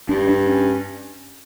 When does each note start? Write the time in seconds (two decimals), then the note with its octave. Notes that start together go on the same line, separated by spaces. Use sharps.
0.09 G2 D4
0.29 D4
0.49 C#4